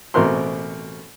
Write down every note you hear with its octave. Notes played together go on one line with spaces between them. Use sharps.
A1 B2 C4 A#4 C5 C6